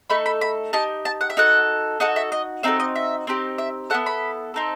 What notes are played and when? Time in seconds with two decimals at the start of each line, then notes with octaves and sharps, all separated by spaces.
0.10 A3 D#4 A4 B5
0.26 B5
0.41 B5
0.73 D#4 G4 A5
1.05 A5
1.21 F#5
1.30 E5
1.37 D#4 F#4 A4 F#5
2.00 D#4 F#4 A4 F#5
2.16 E5
2.32 D#5
2.63 C4 D#4 F#4 A4 E5
2.80 D#5
2.95 E5
3.27 C4 D#4 G4
3.58 E5
3.90 B3 E4 A4 F#5
4.06 B5
4.54 C4 D#4 A4